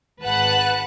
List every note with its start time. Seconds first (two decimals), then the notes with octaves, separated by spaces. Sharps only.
0.21 G#1 B4 F#5 A5 F#6